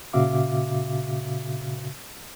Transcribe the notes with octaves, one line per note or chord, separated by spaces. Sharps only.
A#2 C#3 F#4 E5 F5 D6